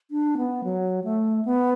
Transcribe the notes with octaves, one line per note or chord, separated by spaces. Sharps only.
D4
B3
F#3
A3
B3